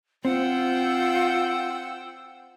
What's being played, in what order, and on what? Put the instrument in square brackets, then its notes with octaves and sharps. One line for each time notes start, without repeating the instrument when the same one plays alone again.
[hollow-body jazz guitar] C4 [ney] F4 [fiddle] F#5 [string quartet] G5 E6